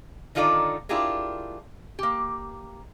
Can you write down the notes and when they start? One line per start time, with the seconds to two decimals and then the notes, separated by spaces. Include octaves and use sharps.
0.35 D3 D#3 D#4 F4 A4 D5
0.89 D4 E4 F4 G4 G#4 A#4
1.99 A#3 G4